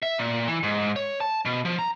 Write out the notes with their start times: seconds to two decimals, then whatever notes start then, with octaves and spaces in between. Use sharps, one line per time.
0.03 E5
0.19 A#2
0.47 E3
0.63 G#2
0.96 C#5
1.20 A5
1.45 B2
1.65 F3
1.79 A#5